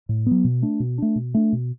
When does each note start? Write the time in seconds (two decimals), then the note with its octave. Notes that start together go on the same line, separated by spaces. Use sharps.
0.09 A2
0.26 F#3 B3
0.44 B2
0.62 A3 D4
0.80 B2
0.98 A3 D4
1.16 B2
1.34 A3 D4
1.53 B2